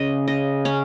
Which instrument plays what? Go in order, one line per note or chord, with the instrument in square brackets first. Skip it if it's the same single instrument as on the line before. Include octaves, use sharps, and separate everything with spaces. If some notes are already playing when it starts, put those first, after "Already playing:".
Already playing: [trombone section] C#3 [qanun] D#5
[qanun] D#5
C#4